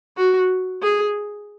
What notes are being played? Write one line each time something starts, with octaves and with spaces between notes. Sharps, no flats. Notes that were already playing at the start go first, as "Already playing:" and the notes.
F#4
G#4